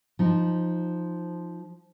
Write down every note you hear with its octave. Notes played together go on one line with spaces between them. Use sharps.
F3 D#4